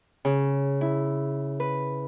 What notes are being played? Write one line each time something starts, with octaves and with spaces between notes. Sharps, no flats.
C#3
E4
B4